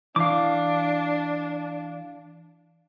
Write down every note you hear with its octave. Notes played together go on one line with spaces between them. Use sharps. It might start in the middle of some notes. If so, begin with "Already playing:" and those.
E3 D4 F5 D6